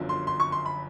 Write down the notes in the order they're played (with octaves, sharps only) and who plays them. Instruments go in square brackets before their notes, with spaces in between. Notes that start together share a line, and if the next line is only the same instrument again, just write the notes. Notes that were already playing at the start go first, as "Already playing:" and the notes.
Already playing: [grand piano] G1 F#2 D3 F3
C6
C6
C#6
C6
B5